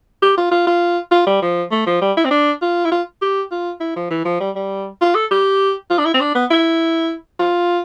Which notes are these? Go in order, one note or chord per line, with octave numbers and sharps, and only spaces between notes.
G4
F4
F4
F4
F4
G3
F3
A3
F3
G3
E4
C4
D4
F4
E4
F4
G4
F4
E4
F3
E3
F3
G3
G3
F4
A4
G4
F4
D4
E4
C4
D4
B3
E4
F4